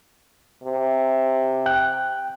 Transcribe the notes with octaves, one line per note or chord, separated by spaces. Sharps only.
C3
G5 F#6